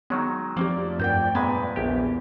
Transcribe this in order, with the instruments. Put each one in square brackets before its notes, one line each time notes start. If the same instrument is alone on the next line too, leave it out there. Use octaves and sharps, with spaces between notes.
[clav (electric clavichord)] D#3 F#3 G#3 [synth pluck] B3 C#5
[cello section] F2 A3 D5 [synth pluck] F3 C4 G4 [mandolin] A#3
[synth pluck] G2 A#4 [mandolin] G5 G6
[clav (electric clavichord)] G2 A#2 G#3 [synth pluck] B3 [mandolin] B4 G#5
[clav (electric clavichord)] A#1 G4 [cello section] E2